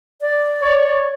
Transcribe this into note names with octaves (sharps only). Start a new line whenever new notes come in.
D5
C#5